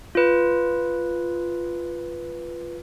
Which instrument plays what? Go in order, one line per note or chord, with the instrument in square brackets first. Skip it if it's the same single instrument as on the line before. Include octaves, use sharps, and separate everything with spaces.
[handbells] F4 B4